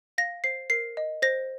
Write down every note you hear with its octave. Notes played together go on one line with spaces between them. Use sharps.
F5 A#6
C5 C7
A#4 C7
D#5
C5 A#6